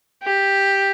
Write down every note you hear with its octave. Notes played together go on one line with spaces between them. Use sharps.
G4